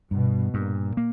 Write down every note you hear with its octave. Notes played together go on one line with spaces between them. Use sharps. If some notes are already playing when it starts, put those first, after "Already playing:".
G2 B2
G2 A#2
A#3